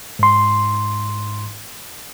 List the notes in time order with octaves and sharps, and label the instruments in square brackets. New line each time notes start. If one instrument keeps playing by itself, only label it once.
[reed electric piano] G#2 C6